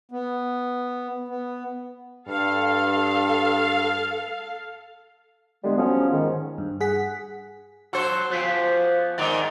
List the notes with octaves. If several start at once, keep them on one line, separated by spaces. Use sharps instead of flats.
B3
B3
G2 A4 F5
D3 G3 G#3 B3
F3 F#3 B3 C#4
G#2 D#3
G2
G#4 F#5 B6
F#3 F#4 A4 C5
F3 B3 G4 G#4
G#2 D#3 D5 G5 A#5